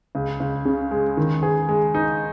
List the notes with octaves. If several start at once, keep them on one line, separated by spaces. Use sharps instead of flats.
C#2
C#2
C#3
G#3
D#3
G#4
G#3
D#4